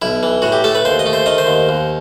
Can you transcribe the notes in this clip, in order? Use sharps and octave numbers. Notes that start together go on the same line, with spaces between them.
B1 E4
E3
A2 F#4
G4
A3 A4
B4
D#2 C5
D#5
A3
C5
D#3 D#5
C5
D#2
D#2